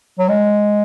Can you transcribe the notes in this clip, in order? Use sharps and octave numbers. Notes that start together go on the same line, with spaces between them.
F#3
G#3